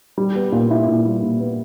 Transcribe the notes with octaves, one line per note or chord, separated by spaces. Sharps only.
G3
B3
A#2
E4
A#2
G3
A#2
B3